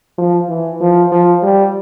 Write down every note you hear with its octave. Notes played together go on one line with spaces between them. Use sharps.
F3
E3
F3
F3
G3